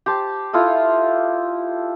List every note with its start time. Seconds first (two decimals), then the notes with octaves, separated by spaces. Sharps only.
0.06 G4 C5 A5
0.53 E4 F4 A4 D#5